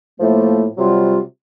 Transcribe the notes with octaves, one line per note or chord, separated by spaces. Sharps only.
A2 F3 A3 A#3
C3 F#3 G3 F4